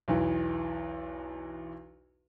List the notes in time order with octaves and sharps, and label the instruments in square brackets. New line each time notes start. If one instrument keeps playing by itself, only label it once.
[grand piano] B1 E2 E3